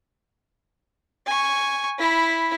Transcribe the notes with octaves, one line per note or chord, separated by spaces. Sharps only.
G#5 C#6
E4 B5